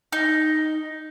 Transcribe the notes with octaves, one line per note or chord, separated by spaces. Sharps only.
D#4